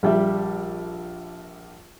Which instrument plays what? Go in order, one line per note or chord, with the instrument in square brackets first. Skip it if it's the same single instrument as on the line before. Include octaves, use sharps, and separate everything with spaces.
[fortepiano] A#1 G3 E5